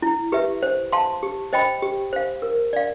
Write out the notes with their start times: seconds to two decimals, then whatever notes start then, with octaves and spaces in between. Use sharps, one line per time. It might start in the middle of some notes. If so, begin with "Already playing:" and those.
0.02 E4
0.32 G4 B4 E5
0.63 C5
0.93 F5 A5 C6
1.23 G4
1.53 C5 D#5 G5 B5
1.83 G4
2.13 C5 F5
2.42 A#4
2.73 D5 F5